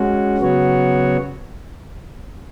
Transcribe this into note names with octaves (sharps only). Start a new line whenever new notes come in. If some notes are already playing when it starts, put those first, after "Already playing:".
Already playing: G#3 C#4 F#4
C#3 F#3 B3 F#4 C#5